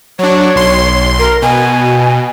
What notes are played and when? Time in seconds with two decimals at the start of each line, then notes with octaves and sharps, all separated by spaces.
0.19 F#3 D4 C#5
0.55 B1 C6
1.19 A#4
1.42 B2 G#5